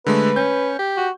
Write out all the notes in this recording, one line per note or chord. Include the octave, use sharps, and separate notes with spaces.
D3 G#3 A3 B4
C#4 G6
G4
F#4